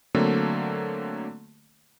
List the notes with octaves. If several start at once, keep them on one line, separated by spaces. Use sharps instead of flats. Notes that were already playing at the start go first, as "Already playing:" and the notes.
D3 F#3 A3 A#3 C4